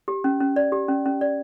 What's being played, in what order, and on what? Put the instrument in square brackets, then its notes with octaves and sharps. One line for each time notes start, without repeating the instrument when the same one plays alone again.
[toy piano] G4
C#4
C#4
D5
G4
C#4
C#4
D5